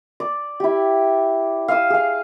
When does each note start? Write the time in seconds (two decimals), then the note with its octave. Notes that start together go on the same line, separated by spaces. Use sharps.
0.20 D5
0.60 E4 G4
1.68 F5 D#6 E6
1.90 G#4 F5